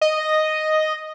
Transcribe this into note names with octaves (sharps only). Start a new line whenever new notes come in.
D#5